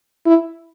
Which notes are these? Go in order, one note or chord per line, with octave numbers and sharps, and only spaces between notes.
E4